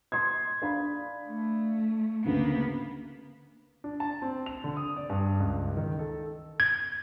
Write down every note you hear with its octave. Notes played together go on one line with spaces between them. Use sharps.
C6 D#6 G#6
D4 F5 B5
A3
D2 C#3 A#3 B3
D4
A5
C4
F7
D3
D#6
D5
G2
C#2
D#3
A4
G#6